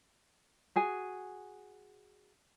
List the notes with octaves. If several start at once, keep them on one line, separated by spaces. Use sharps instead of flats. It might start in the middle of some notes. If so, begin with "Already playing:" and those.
F#4 G#4 G#5